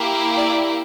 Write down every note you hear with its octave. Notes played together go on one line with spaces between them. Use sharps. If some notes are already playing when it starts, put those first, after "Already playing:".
Already playing: A#3 E4 G4
D5